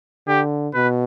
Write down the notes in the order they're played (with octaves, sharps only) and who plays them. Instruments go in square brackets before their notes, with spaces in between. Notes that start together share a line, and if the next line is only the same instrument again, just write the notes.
[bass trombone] D3 [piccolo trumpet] G4
[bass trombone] B2 [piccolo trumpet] B4